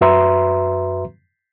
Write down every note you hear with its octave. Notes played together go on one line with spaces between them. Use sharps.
F#2 F#4 B4 E5 A#5 C6